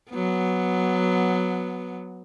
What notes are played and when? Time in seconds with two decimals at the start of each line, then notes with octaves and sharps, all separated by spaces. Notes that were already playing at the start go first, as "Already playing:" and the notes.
0.11 F#3 B3